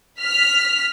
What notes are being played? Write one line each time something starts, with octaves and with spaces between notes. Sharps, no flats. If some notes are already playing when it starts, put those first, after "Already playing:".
F6 B6